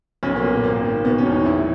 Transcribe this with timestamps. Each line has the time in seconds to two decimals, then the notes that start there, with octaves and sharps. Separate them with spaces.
0.23 B1 C#4
0.36 A#3
0.43 A#2 B3
0.63 G#1 A#3
0.84 D#3 A#3
1.05 B2 B3
1.18 C#4
1.25 E2
1.32 D#4
1.45 A#1 E4